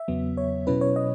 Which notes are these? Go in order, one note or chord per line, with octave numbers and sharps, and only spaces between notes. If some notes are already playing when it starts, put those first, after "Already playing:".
Already playing: E5
E2 C#3 F#3 B3
C#5
B2 F#3 C#4 E4 B4
C#5
D#5